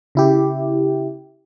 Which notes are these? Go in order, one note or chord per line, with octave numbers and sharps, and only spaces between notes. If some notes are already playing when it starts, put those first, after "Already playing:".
C#3 E4 G4